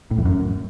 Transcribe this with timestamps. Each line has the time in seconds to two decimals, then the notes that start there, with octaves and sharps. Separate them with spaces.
0.11 A2
0.18 E2
0.25 F#2